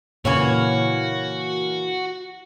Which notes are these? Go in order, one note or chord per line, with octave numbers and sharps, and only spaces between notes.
A#2 C#3 E3 A#3 F#4 C#5